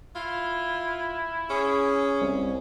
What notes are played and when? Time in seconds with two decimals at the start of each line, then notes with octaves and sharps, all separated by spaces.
0.16 E4 F4
1.50 C#4 G#4
2.21 C2